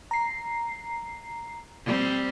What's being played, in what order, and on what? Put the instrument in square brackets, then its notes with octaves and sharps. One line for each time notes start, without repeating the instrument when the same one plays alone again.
[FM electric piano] A#5 C7
[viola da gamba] G3 C4